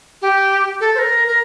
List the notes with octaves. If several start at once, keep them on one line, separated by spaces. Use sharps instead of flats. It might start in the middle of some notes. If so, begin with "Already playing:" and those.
G4
A4
C5
A#4
A#4